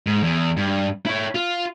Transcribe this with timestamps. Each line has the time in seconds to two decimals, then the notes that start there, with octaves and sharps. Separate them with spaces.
0.07 G#2
0.23 E2
0.57 G2
1.06 E4 C#5
1.35 F4